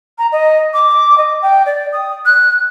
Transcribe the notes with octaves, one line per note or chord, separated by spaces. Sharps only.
A#5
D#5
D6
D#5
G5
D5
D#6
F#6